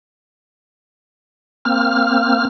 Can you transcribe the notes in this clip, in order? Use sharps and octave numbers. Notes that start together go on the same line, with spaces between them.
A#3 C4 F6